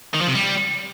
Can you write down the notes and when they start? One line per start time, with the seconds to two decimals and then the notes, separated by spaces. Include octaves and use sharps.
0.14 D#3
0.21 F3
0.28 C3
0.35 G3